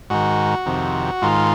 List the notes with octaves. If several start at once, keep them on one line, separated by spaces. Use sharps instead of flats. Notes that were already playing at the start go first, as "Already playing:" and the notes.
G#2 D#3 F#4
F2 C3 D#3
G#2 D#3 F4